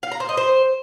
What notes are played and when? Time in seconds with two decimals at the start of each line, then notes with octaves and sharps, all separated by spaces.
0.03 F5
0.12 A#5
0.20 C5
0.29 D#5
0.37 C5